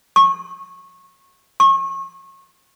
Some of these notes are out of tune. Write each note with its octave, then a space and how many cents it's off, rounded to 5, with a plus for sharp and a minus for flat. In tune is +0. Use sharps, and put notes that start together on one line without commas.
C#6 -25
C#6 -35